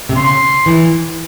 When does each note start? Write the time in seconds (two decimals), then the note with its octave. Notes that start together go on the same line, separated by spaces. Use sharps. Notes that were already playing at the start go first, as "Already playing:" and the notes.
0.09 C3
0.16 C#3 C6
0.66 E3